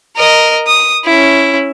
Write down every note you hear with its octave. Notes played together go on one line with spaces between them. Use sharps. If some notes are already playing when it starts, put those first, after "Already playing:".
A#4 D#5
D#6
C#4 E4